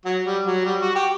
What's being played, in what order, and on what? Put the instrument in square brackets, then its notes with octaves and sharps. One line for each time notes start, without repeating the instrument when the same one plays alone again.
[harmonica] F#3
G3
F#3
G3
F#4
G4